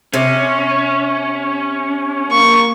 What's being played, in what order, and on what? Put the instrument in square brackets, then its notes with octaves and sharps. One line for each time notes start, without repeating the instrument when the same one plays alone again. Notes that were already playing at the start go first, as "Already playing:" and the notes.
[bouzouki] C3 [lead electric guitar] C#4
[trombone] A#3 [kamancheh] C#6